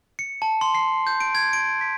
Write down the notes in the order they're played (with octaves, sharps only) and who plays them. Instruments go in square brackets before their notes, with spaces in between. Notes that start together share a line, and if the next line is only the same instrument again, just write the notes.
[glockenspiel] C#7
A5
C6
C7
G6
D7
G#6
D7
B6